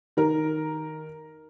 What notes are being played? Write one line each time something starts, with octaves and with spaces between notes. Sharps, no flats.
D#3 A#4